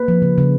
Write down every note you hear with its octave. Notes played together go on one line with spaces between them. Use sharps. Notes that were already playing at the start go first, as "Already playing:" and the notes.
Already playing: A#3 B4
F3
C#3
C#3